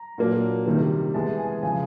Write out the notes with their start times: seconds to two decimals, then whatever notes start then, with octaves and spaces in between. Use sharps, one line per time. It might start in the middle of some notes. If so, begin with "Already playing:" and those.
Already playing: A#5
0.18 A#2 F#3 A#3 D4
0.66 C3 D#3 G3 A#3
1.14 E3 G#3 B3 A5
1.39 G#5
1.63 C#3 F3 G#5